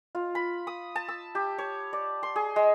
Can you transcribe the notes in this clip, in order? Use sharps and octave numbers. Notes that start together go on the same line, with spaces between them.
F4
B5
D#6
A5
E6
G4
C#5
D5
C6
G#4
G#3